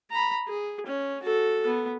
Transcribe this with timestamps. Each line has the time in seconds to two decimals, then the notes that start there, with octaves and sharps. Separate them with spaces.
0.11 A#5 B5
0.48 G#4
0.87 C#4
1.23 F#4 A4
1.66 B3